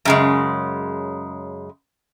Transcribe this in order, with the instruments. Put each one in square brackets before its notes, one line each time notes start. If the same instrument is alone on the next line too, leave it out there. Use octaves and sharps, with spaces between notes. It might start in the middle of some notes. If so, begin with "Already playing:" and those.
[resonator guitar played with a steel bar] F#2 C#3 G#3